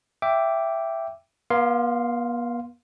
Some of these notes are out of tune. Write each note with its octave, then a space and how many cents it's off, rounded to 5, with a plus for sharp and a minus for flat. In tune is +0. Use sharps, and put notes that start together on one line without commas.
E5 +10 G5 +0 D6 -5
B3 -45 F5 +0 C6 +0